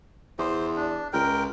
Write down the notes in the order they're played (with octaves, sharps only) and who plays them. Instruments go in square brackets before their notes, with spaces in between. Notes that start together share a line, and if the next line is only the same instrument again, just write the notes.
[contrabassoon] E2 [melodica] C5
[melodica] D4
[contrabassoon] C#2 [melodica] A#4 G5